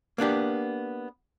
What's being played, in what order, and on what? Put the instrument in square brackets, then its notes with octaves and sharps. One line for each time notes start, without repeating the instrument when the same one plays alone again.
[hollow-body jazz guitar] A#3 B3 D4 G4